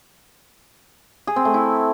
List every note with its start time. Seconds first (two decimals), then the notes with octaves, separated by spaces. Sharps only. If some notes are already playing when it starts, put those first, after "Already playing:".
1.27 G#4
1.36 C4
1.45 A3
1.54 E4